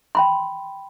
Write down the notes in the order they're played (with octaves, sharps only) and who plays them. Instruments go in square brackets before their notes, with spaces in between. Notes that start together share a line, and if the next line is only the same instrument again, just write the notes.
[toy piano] G5 B5 C6